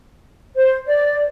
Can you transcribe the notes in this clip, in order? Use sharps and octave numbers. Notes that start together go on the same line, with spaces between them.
C5
D5